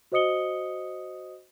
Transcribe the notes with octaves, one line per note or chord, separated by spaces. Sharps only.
F#4 C5 D#5 D#6 C#7 G7